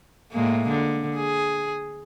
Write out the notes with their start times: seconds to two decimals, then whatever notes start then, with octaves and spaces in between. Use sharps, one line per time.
0.32 A2 G#3 A#3
0.69 D3
1.15 G#4